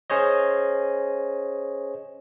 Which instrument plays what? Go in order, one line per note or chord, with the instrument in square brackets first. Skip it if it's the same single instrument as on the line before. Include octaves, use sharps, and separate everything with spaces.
[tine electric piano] C#4 G#4 C5 C#5 D#5